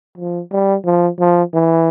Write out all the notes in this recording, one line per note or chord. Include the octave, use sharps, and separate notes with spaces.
F3
G3
F3
F3
E3